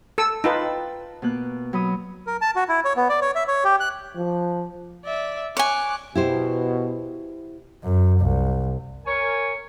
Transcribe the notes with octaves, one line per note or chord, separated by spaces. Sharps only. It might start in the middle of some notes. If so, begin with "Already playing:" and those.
A4 E6
D#4 F4 B4 G5 A5
B2 A#3 F#6
F#3 B5 D#6
A#4
A5
F#4
E4
C#5
B3
D5
C#5
E5
C#5
G4
F#6
F3
D5 E5
C#5 G#5 D6 F#6
B2 E4 G4 C5
F#2
C2
A#4 C#5 G#5